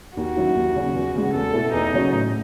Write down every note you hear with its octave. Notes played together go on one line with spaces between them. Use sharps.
D#2 F#4
D#3 F#3 C#4 E4
D#2
C#3 F#3 C#4
E2
C#3 G#3
E2 A4
B2 A3 E4
E2 D#4
C#3 F#3 C#4
A2